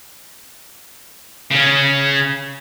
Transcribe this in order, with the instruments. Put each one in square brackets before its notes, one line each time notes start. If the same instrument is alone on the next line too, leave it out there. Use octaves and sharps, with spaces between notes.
[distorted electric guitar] C#3 C#4